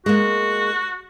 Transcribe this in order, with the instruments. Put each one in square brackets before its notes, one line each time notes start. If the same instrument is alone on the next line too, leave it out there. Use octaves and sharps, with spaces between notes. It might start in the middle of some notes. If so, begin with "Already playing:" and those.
[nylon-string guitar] G#3 A#3 [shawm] F#4